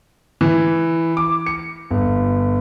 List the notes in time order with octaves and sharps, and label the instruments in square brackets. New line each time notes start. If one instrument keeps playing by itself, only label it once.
[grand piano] E3
D6
C#7
G1